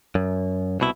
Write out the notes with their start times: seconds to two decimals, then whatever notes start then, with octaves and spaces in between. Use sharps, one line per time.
0.15 F#2
0.80 C2 B2 E4